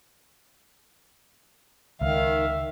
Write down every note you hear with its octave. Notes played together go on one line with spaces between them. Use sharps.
C#2 D#3 E5 F5